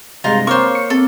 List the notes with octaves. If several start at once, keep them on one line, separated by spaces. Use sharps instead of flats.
G2 C3 G#3 D#4 F4 A#5
A#3 C4 C5 C#5 C#6
C#7
C4 A4